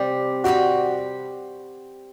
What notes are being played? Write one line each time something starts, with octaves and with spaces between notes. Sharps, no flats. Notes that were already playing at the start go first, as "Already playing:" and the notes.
Already playing: C3 G3 C4 G4 C5
G3 C4 F#4 G4 C5